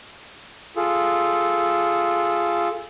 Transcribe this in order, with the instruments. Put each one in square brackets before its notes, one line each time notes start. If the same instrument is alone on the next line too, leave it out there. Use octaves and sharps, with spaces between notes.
[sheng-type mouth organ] F4 G#4 A4